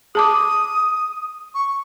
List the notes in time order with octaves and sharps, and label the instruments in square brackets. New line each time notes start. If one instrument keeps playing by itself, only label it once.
[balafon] G#4 A5 D6 [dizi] D#6
[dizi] C#6